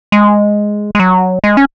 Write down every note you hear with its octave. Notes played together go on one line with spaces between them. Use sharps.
G#3
G#3
F#3
G#3
C#4